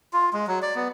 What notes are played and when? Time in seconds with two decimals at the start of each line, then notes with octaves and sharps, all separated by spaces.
0.13 F4
0.33 G#3
0.47 F#3
0.62 D5
0.75 B3